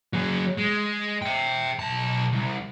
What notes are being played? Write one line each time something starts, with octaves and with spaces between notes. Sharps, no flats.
F#3 G#4
G#3
E5 G5
B1 A5
C2